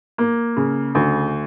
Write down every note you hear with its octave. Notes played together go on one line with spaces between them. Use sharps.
A#3
C#3
D2